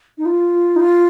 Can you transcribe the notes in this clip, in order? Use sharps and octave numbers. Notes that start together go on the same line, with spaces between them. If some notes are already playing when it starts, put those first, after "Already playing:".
D#4
F4
D#4
F4